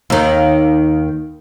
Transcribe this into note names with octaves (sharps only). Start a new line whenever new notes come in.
D#2 D#3